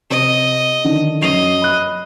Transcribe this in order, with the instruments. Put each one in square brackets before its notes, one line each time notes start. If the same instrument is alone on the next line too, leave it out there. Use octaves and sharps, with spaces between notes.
[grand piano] C3 [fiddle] D#5
[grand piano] D3 D#3
[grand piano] F#2 C7 F7 [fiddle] D#5
[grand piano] B5 F#6